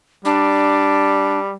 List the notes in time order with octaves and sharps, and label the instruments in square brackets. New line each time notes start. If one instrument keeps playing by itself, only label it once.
[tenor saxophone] G3 [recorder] D4